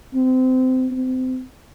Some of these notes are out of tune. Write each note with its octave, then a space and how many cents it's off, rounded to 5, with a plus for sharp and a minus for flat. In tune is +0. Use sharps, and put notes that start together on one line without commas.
C4 -25
C4 -30